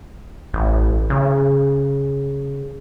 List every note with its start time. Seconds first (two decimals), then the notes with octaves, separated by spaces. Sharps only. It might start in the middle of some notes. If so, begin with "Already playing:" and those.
0.54 A1
1.10 C#3